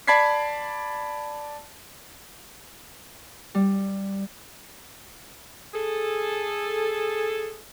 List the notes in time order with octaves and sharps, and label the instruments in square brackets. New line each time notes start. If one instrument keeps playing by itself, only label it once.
[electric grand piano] D5 A5 B5 G#6 B6 C7
[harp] G3
[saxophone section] G#4 A4